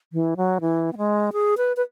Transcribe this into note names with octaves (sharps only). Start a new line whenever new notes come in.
E3
F#3
E3
B3
G#3
G#4
B4
B4